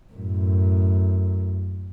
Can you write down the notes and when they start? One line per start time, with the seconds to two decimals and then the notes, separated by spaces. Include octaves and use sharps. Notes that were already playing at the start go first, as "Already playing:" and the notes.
0.13 F#2 A2